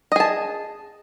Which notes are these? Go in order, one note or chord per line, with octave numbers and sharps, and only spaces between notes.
G#4 D#5 A5